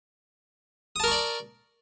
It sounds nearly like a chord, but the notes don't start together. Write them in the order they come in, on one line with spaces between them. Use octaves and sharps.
D#6 A5 A#4 C#6 D5